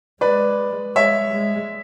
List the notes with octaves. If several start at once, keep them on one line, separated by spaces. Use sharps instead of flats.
G#3 B4 D5
G#3 C#5 E5
G#3